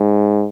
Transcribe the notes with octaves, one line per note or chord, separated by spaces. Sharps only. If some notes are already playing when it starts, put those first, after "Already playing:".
Already playing: G#2